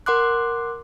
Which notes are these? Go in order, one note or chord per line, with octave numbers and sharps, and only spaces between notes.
A#4 F#5 C6 D6 F#6